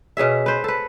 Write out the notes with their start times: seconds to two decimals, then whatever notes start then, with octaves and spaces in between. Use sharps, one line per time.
0.17 B2 C#4 G#4 E5
0.46 B4 C5
0.64 A4 B4